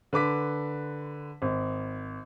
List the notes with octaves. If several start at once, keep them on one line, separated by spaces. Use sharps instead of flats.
D3 B4 D6 B6
G#1